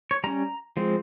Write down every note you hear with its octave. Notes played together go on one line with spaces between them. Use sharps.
C#5
G3 C#4 A#5
F3 G#3 C4